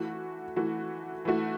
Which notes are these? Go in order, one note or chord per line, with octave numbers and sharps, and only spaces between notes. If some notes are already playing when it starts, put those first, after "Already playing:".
Already playing: E3 A3 F#4
E3 A3 F#4
E3 A3 F#4